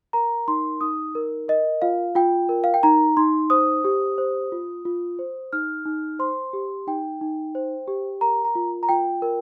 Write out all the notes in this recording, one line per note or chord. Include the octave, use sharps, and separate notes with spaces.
A#4 A#5
D#4 C6
D#4 D#6
A#4
A#4 D#5
F4 F5
F4 G5
A#4
F5
G5
D#4 A#5
D#4 C6
C5 D#6
G4
C5
F4
F4
C5
D#4 F6
D#4
C5 C6
G4
D#4 G5
D#4
C5
G4
A#4 A#5
A#5
F4
A#5
F4 G5
A#4